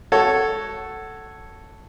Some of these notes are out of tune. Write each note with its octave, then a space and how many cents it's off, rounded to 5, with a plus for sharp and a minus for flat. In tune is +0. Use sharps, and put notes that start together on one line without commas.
F#4 +15 A4 +0 C#5 -5